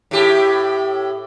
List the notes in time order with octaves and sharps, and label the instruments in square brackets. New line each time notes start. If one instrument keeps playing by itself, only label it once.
[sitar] A2 G4